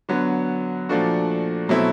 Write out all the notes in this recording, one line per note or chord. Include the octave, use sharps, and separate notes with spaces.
D3 F#3 B3
A#2 F3 A3 D4 F#4
B2 F#3 A3 C4 E4